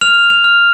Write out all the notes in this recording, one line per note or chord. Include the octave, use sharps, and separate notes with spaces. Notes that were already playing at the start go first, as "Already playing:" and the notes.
F6 F7
F7
F6